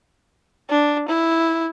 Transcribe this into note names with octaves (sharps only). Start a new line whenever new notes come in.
D4
E4